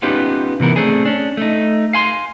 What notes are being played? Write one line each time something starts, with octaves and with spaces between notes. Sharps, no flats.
B3 C#4 D#4 F4 G4 B4
C3 E3 B3 A#4
A3 C4 D4 G#4
C#4 D4
A3 D#4
F5 G#5 C6